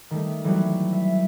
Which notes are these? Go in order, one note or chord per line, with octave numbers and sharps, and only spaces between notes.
D#3 G3 A3
E3 F#3 G3 A3 B3 F#4
E5